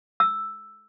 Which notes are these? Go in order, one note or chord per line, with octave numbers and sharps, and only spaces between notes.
E6